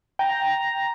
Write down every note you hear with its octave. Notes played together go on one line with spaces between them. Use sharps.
G5 A#5